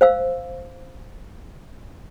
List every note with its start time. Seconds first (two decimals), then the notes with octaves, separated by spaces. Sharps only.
0.01 C5 F5 E6